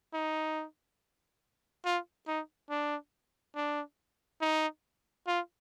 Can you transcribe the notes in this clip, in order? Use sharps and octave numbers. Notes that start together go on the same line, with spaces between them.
D#4
F4
D#4
D4
D4
D#4
F4